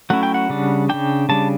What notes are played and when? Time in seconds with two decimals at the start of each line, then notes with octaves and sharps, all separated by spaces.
0.10 F#3 A3 C#4 E4 F#5
0.23 G5
0.34 F#5
0.50 C#3 G3 D4
0.89 G3 D4 G5
0.93 C#3
1.29 C#3 G3 D4 A5